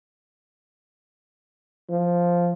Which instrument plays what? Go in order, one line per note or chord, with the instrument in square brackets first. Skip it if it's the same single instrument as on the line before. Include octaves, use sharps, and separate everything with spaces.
[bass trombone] F3